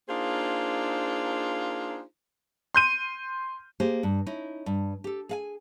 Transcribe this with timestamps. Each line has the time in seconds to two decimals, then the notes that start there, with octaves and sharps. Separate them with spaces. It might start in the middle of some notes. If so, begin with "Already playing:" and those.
0.09 A#3 D4 D#4 F4 G#4 C5
2.75 C6 G6 D#7
3.80 A#3 G4 G#4 C5
4.03 G2
4.26 C#4 D#4 E4
4.66 G2
5.04 G4 A4
5.29 G#4 F5 G#5